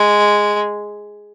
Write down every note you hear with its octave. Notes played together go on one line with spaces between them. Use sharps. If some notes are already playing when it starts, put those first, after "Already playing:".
Already playing: G#3